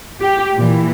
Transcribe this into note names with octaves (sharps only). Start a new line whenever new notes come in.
G4
A#2 E3